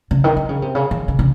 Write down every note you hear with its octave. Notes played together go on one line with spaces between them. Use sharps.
C#3
D#3
D#3
C#3
C3
C#3
D#3
C#3
C#3